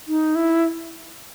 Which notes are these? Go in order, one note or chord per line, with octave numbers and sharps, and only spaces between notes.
D#4
E4